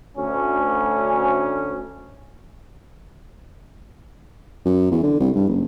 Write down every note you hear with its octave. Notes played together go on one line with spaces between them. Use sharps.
D2 C#4
F#2
E2
D3
C2
G2
F#1